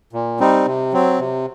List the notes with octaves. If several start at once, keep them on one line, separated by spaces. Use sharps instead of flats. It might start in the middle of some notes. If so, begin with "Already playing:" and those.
A#2
G3 C4 D#4
C3
F#3 C4
C3